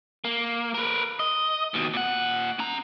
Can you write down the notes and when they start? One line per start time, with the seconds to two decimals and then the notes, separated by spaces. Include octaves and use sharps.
0.25 A#3
0.75 A#4 B4
1.19 D#5
1.74 D#2 B2
1.94 A#2 F#5
2.59 C#4 A#5